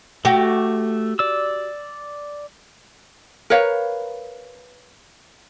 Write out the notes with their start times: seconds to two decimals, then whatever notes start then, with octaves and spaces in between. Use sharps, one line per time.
0.25 A3 F#4 G4
1.19 D5 E6
3.50 A#4 B4 C#5 F5